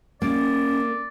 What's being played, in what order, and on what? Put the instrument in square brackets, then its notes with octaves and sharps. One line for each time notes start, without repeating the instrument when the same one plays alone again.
[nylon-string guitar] A#3 [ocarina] C#4 [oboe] D5